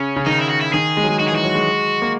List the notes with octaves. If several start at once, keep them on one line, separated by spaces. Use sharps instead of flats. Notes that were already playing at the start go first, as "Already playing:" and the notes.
Already playing: C#3 C#4
C#3
D#3 D#4
E4
F#4
E4
D#3 G#4
G#3
F#3
G#3
D#4 F#4
G#4
E3
F#4
F#3
G#3
A#3